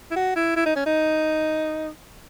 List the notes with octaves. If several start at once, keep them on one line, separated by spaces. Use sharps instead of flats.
E4
F#4
E4
E4
D#4
C#4
D#4